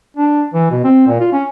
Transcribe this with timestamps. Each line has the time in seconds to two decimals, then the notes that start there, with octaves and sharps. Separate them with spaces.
0.17 D4
0.54 E3
0.71 B2
0.84 C4
1.08 A#2
1.21 F4
1.33 C#4